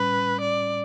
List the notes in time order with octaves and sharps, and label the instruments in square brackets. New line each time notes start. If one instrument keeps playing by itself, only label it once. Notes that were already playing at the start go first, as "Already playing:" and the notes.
Already playing: [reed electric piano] A2 G3 C#4 [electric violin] B4
[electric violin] D5